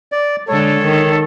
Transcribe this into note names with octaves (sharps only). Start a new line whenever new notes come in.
D5
D3 G#3 A4 C#5
D#3